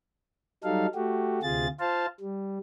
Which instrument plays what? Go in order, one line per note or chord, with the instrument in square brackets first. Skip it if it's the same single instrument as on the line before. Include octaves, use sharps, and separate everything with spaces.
[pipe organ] F#3 G3 D#4 A4 F5
A3 F#4 G4
D2 C3 F4 G#4 A6
F4 C5 F5 A5
G3